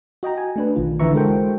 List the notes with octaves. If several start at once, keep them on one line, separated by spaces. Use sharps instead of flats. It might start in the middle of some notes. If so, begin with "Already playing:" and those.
F#4 D#5 G5 A#5
G#5
A3 D4 B4
B1 D#3 F4
D3 E3 B4 E5 A#5 C#6
G#3 F#4 A4 A#4 C5 G5